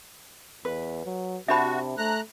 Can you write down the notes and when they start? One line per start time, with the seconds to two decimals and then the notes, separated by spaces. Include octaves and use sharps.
0.65 E2 B4
1.05 F#3
1.48 C3 D4 F#4 C5 E5 A5 B5
1.98 A3 A#5 F#6